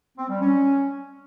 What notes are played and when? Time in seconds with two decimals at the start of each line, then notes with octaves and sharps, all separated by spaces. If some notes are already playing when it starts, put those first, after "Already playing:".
0.18 C4
0.30 G3
0.41 C#4